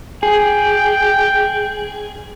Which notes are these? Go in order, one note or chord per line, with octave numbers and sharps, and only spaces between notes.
G#4 G5